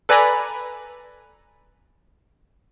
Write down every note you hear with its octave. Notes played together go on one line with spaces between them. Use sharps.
A4 B4 D5 G#5 A#5 B5